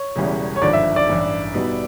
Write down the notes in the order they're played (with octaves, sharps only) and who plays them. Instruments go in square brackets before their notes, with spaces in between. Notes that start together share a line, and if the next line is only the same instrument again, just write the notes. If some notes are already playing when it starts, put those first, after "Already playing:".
Already playing: [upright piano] C#5
[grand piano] E1 E2 C#3 E3 G3
[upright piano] C#5
[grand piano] G#1 G2 D3 F3 [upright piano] D5
[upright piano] E5
D5
[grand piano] A1 G2 E3
B2 G3 B3 D#4